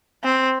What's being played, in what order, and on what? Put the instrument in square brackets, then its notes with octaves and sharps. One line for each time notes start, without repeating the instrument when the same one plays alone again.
[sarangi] C4